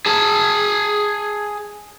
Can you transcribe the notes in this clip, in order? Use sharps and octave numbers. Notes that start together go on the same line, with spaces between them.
G#4 A5